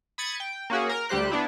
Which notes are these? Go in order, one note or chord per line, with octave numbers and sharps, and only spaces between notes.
B5 D#6 G#6 A6 C#7
G5
A#3 C#4 F#4 G#4
A#4 A#5
D2 G3 G4 C5 F#6
B3 D4 E4